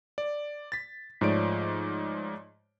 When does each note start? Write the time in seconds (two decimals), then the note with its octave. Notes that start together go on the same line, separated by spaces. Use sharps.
0.18 D5
0.72 A6 B6
1.21 G#2 F3 A3 C#5 D5 D7